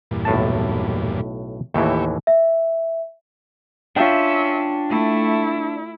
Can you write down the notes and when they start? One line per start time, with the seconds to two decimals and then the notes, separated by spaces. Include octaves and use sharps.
0.11 E2 G2 A#2
0.25 B1 A2 A5
1.74 D#2 A2 E3 G4 C#5 E5
2.27 E5
3.96 C#4 D4 F4 E5 G5
4.90 A3 E4